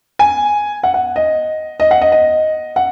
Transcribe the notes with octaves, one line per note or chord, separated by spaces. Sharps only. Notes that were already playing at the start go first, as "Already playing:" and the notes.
G#5
F#5
F#5
D#5
D#5
F#5
D#5
D#5
F#5